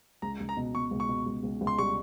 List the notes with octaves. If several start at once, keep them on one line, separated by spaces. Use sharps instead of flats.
C#2 A#5
C#2
A#5
B2
B2 C#6
C#2
C#6
B2
C#2
C#2
C#2
C6
G3 C#6